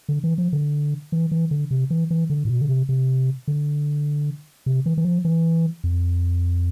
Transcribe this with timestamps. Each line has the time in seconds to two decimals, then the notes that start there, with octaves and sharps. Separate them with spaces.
0.09 D3
0.24 E3
0.38 F3
0.53 D3
1.12 E3
1.31 E3
1.51 D3
1.71 C3
1.90 E3
2.11 E3
2.30 D3
2.45 A2
2.50 B2
2.61 D3
2.69 C3
2.89 C3
3.48 D3
4.66 C3
4.86 E3
4.98 E3
5.05 F3
5.25 E3
5.84 F2